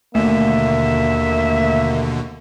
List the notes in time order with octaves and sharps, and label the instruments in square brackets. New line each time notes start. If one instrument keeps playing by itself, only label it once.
[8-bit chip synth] D#2 B2 D3 [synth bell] A3 [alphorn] A#3 [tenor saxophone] E5